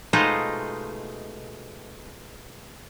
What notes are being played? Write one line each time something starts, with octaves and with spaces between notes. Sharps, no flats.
B2 G#3 A3 D#4 F4 C5